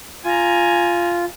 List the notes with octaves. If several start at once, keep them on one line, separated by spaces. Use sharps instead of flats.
F4 G#5 A#5